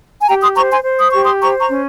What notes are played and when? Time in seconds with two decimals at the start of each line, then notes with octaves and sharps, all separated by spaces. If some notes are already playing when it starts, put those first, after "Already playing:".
0.21 G#5
0.28 G4 G5 A#5
0.42 C6 D#6
0.56 C5 A#5 C#6
0.70 G#5 C6
0.84 C5
0.98 D#6
1.11 G4 C#6
1.24 C6 D#6
1.41 C5 A#5 C#6
1.59 A#5 C#6
1.69 C#4